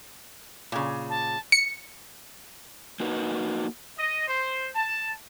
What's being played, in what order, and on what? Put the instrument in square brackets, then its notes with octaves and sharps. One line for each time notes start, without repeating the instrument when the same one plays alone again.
[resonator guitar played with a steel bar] A#2 C#3
[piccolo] A5
[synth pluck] C#7
[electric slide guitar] A#3 D#4 F#4 B4
[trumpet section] D#5
C5
A5